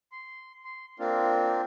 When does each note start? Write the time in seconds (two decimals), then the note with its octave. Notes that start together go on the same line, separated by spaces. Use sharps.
0.12 C6
0.65 C6
0.99 A#3 C4 D4 F4